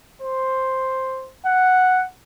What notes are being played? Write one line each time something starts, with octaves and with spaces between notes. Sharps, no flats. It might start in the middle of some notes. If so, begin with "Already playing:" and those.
C5
F#5